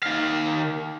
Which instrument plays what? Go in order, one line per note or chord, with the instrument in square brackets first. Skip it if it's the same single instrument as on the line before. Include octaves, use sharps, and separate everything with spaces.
[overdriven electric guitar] D#3 F5